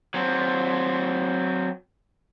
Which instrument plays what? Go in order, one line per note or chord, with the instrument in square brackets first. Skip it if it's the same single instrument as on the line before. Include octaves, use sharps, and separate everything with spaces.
[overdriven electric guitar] F#3 C4